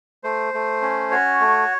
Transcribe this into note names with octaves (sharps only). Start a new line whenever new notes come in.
A3 C5
A3
C#4
F#4 C#5
A3